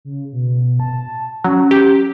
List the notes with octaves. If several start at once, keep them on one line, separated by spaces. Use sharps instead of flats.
C#3
B2
A5
F#3 C#4
G4